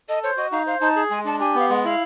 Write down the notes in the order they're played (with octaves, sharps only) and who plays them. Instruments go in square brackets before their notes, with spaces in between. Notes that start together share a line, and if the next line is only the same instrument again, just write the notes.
[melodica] A4 [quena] D#5
[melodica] C5 [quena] C#5
[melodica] F#4 [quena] D#5
[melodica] D#4 [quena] F5
[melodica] C5 [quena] F5
[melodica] D#4 [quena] A5
[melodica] G#4
[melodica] G#3 [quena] G#5
[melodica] D4 [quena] A5
[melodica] G4 [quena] G#5
[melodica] B3 [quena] F5
[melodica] G#3 [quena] F#5
[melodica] E4 [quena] F5